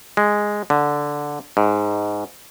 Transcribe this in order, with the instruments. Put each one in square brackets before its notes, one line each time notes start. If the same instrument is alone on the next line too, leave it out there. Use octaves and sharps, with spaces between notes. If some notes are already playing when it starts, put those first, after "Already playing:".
[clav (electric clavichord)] G#3
D3
G#2